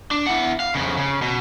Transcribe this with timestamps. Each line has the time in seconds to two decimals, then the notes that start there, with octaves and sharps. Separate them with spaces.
0.11 D4
0.27 E4 F#5
0.60 F5
0.75 F2 C#3
0.97 C#3
1.22 B2